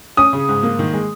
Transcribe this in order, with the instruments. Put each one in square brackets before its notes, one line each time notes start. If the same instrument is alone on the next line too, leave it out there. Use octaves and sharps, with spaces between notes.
[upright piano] C#4 [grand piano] D#6
[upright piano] C#3
G#2
A#3
D#3
G#3